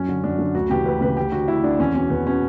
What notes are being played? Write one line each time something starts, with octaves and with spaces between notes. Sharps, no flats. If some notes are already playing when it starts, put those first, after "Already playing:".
Already playing: F#2 C#4
D3
F#2 D4
D3
D2 F#4
C#3 E3 G4
D2 B4
C#3 E3 B4
D2 G4
D3 F#4
D2 E4
D3 D4
E2 C#4
B2 C#4
E2 B3
B2 C#4